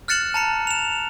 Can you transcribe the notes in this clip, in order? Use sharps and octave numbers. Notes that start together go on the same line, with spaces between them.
F6 F#6 A6 C#7 E7 F#7
A5 A#5 C#7
E7 F7